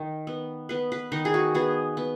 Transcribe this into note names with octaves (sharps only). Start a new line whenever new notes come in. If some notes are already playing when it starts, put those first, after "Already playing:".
Already playing: D#3
B3
B3 B4
B4
D#3 D#4
G#4
F#4
B3 G#4
B3